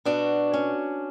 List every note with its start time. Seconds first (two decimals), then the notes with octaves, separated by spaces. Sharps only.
0.05 B2 D4 F#4
0.54 C#4